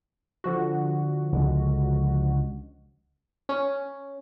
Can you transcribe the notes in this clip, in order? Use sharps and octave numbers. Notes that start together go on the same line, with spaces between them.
D3 F3 F#4
C#2 G#3
C#4